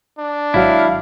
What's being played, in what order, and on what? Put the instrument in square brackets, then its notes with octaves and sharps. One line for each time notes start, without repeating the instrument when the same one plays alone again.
[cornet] D4
[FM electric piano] G#1 F#3 [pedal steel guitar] E4 [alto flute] F5